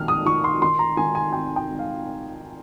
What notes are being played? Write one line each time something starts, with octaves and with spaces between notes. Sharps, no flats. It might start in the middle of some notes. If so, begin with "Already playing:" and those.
Already playing: A#1 G#2 D#3 F6
D#6
D#3 C#6
C6
D#3 C6
A#5
D#3 G#5
G#5
G#1 G5
G5
G#1
F5